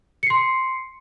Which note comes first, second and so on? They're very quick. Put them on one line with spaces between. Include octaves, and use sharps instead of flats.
C#7 C7 C6